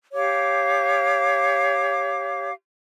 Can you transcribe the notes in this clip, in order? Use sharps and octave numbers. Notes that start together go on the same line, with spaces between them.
G4 C#5 F5 D6